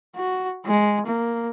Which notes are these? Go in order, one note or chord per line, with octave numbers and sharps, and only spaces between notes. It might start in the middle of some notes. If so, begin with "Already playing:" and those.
F#4
G#3
A#3